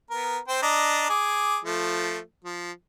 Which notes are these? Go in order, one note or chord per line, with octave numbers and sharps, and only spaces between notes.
B3 A#4
C4 C5 G5
D4 D#5 A#5
G#4 D6
F3 A3
F3